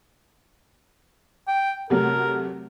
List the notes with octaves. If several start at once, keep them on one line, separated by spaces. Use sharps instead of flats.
G5
C3 F#3 A3 A#4